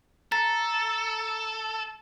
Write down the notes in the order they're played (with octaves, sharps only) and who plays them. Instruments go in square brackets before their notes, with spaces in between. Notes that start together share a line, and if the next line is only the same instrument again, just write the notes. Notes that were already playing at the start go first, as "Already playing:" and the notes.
[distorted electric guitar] A4 [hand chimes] A#5 A6